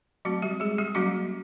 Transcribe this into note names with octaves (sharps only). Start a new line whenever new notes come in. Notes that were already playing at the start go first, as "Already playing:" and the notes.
F#3 A3 C4 F#4
G3 G4
G#3 G#4
G3 G4
F#3 G3 A#3 C#4 F#4